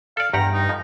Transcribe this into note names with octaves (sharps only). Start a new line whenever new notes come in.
A4 D5 F5
E2 G2 G4 F#5 A#5
D#4
F2 F3